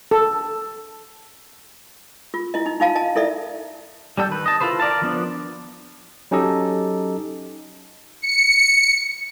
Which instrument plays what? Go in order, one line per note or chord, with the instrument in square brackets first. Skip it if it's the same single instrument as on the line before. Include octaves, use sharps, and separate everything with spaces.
[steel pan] A4
[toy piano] F4
E4 D#5
D#4
D#4 F4 F5 A5
D#5 A5
E4 A4 D5 E5
[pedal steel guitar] G3 C#4 A4 G5 G6
D#3 B4
D#5 A5
E4 F4 A4 B4 C5
A#4 D5 F5 A5
F3 B3 D4
[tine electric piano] F#3 C#4 D#4 G4 A4 D#5
[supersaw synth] C#7